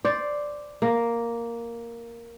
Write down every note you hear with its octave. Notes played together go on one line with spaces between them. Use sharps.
C5 D5
A#3